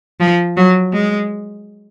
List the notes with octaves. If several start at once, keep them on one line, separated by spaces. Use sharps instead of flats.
F3
F#3
G#3